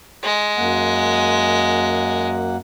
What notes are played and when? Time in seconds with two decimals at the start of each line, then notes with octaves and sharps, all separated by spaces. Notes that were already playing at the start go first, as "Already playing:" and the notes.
0.23 G#3
0.57 F#2 A#3 F#5